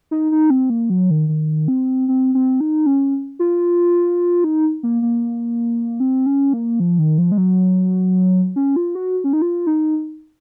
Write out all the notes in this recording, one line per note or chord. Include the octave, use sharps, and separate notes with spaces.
D#4
D#4
C4
A#3
F#3
D#3
D#3
C4
C4
C4
D#4
C#4
F4
D#4
A#3
A#3
C4
C#4
A#3
F3
D#3
F3
G#3
F#3
C#4
F4
F#4
C#4
D#4
F4
D#4